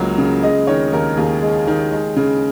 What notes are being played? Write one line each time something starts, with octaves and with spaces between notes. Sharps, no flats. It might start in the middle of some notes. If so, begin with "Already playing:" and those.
Already playing: C#2 C#3 F#3 A#3
C#3
G#3 D#5
D#3 C#5
D#2 A#4
D#2 G#4
G#3
D#3
G#3
C#3